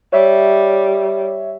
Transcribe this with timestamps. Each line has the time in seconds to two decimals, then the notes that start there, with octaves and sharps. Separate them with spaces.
0.12 G3 C#5 E5